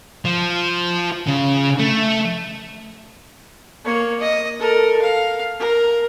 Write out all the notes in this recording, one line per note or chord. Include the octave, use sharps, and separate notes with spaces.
F3
C#3
A3
A#3 C#5
D#5
A4 A#4
F5
A#4